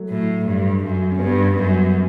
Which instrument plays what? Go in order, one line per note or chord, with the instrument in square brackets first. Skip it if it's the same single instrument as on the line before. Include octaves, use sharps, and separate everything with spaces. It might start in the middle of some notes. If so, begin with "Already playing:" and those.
Already playing: [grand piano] F#3 A3
[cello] A2
G2
F#2
[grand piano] C#4
[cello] G2 [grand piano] G3 B3
[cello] F#2